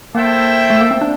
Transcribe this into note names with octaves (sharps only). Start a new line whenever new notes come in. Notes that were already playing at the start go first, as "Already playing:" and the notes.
A#3 E4 A4 C5 E5 G5
A3
A#3
C4
D4